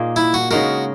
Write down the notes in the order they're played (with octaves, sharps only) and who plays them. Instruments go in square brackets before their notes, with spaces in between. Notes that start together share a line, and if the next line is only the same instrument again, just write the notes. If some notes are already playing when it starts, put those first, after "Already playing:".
Already playing: [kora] A#2 A#3 D#4 G#4
[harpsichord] E4
F#4
[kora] C#3 G#3 D#4 A#4 [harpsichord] F#4